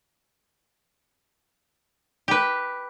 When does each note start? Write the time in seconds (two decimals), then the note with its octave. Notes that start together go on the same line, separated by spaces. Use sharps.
2.28 G4 B4